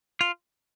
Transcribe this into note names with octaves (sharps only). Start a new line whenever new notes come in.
F4